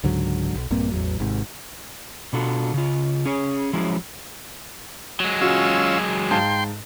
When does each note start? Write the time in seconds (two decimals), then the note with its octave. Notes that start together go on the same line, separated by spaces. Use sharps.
0.04 C#2 G#2 D3 F#3
0.55 B1
0.70 A#1 G2 A#3 C4
0.91 A1 E2 F#3
1.19 G#1 G#2 C3
2.33 B2 D4 F4 F#4 A4
2.74 C#3 F4
3.26 C#4 G#4 C#5
3.73 F3 F#3 G#3 C#4 E4 F4
5.20 F#3 G#3
5.41 C#4 F4 F#4 E6
6.31 G#2 F5 G5 A5 C6